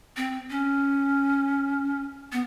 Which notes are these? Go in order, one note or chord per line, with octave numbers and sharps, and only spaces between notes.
C4
C#4
B3